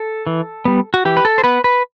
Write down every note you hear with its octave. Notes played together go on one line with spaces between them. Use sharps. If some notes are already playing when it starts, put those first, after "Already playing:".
Already playing: A4
E3
G3 B3
F#4
E3 G4
B4
A4
C5
B3 B4
B4